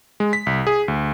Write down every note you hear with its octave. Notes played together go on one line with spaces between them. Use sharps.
G#3
B6
C2
G#4
D2